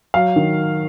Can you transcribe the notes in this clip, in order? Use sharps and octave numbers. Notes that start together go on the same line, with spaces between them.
F#3 F5
D#3